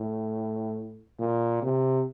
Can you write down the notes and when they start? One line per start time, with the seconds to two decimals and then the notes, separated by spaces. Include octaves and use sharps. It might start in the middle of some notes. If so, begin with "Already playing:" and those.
Already playing: A2
1.19 A#2
1.62 C3